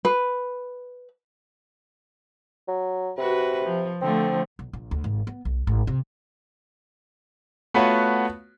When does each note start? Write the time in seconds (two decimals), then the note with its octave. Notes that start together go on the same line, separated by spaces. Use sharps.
0.05 B4
2.68 F#3
3.18 C3 F#4 B4
3.65 F3
4.02 D3 F3 A3 C4
4.59 B1
4.73 A#1
4.91 D2
5.04 G#1
5.27 B3
5.45 B1
5.67 G#1
5.87 C3
7.74 A3 B3 F4 F#4 B4 C#5